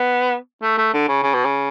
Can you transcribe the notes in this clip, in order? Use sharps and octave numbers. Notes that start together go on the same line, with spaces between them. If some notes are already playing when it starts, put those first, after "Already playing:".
Already playing: B3
A3
A3
D3
C#3
C#3
B2
C#3